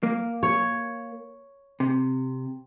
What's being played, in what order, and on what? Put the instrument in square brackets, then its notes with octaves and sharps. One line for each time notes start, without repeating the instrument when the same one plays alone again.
[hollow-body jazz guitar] A#3
[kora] C#5
[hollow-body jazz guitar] C3